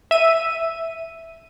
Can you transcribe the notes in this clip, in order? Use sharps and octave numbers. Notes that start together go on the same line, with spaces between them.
E5 D#7